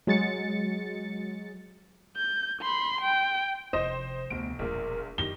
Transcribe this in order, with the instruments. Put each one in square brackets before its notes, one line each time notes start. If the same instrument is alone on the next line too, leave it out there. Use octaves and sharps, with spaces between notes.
[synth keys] F#3 G#3 A6 C#7
[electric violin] G6
B5 C6
G5
[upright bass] F1 [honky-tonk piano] C5 [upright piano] D#5
[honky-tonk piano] F1 D7 [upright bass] D2 [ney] B3
[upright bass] E1 G3 [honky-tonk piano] A#1 A#2 [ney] A#4
[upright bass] F#2 [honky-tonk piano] D#3 A#6 [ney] G4 [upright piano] G7